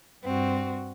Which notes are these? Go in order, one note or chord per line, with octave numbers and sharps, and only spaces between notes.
G2 C4 F#4